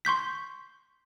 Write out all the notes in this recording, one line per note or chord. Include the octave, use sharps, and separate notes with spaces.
C6 C#6 G6 B6